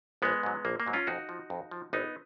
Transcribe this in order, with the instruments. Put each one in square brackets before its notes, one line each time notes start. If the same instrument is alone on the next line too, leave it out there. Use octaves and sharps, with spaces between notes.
[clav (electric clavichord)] A#1 G#3 B3
G#2 F#3
A#1 A#3
A#3
G#2 F#3
C#4 F4
F2 D#4 F#4
F3
F2
F3
G#1 B3 D#4